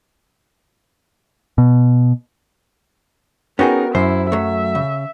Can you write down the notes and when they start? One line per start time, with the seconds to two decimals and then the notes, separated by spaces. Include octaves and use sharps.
1.58 B2
3.59 B3 C#4 D#4 F#4 G#4 A#4 G5
3.95 F#2 E4 C5
4.32 F#3 A3 E5
4.75 C#3